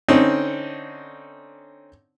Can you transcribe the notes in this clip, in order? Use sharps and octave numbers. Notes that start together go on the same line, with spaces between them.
D3 C4 C#4 D#4